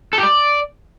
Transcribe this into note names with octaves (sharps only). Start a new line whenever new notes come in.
A4
G4
D5